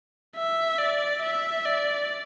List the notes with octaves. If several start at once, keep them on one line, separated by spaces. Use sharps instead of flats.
E5
D5
E5
D5